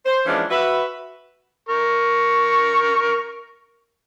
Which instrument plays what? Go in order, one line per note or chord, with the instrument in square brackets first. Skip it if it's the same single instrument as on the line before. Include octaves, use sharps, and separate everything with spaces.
[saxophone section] C5
E3 F3 G#3 A#3 C#4 D4
F#4 B4 E5
[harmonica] A#4 C#6